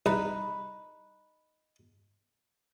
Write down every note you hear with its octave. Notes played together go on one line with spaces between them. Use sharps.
C2 D#4 B4